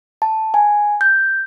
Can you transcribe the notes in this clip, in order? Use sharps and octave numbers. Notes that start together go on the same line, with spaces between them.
A5
G#5
G6